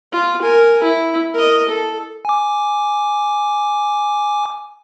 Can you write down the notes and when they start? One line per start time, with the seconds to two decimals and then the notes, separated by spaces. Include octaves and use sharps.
0.12 F4
0.42 A#4 G#5
0.83 E4
1.34 A#4 D#5
1.69 A4
2.25 G#5 D6